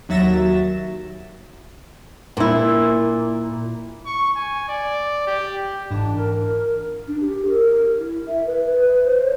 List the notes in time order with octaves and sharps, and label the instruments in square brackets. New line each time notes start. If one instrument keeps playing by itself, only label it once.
[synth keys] D#2 F#3 E5 A6 A#6 E7
[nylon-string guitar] A#2 E4
[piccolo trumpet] C#6
G#5
D5
G4
[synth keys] G1 G#2 E3 [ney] D4
[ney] A#4
D4
G4
A#4
E4
E5
B4
B4
C5
C#5